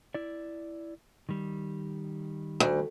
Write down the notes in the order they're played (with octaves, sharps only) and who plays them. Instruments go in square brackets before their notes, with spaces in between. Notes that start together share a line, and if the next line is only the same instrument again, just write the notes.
[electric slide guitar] E4 D5
D#3 G3
[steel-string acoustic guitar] D2